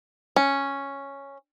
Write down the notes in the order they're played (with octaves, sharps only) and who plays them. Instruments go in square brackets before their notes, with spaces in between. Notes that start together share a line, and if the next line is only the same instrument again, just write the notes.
[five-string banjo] C#4